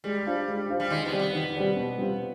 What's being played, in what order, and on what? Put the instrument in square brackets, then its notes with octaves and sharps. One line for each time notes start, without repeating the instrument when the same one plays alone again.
[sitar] G3 [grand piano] G#3
[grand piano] D4 F4 C5 F5
G#3
D4 F4 C5 F5
[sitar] G3
[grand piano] D#3 [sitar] G#3
[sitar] B3
[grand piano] G3 C4 G4 D5
[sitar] B3
[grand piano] D#3
G3 C4 G4 D5
B2
G3 C4 F4